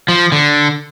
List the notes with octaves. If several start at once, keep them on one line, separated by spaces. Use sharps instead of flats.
F3
D3